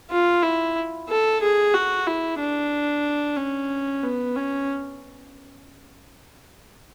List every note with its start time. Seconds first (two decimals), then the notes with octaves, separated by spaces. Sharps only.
0.11 F4
0.43 E4
1.09 A4
1.42 G#4
1.74 F#4
2.07 E4
2.39 D4
3.37 C#4
4.03 B3
4.36 C#4